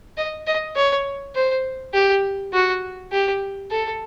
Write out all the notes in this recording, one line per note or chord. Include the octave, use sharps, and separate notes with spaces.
D#5
D#5
C#5
C5
G4
F#4
G4
A4